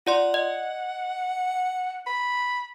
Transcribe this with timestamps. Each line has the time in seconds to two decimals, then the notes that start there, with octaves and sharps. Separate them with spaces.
0.07 F4 D5 F#5 C6
0.34 D#5
2.06 B5